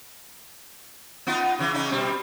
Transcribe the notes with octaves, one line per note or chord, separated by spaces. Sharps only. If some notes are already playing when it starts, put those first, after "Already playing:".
B3 D#4 F4
C#3 E3
C#3 C#4 D#4
B2 G3 C4